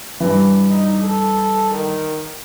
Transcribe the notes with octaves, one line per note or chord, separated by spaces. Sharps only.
G2 E3
D#4
A4
D#3